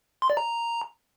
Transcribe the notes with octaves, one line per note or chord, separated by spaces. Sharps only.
C6
D5
A#5